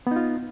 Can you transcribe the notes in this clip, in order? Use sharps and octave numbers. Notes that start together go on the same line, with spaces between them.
B3 D#4 F4